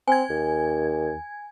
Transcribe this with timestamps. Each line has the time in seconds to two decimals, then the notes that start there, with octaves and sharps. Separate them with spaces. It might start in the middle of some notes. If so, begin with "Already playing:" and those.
0.08 C4 G#5 G#6
0.30 D#2